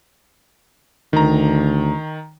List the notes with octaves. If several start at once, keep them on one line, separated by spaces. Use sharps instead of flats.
D2 D#3 A#5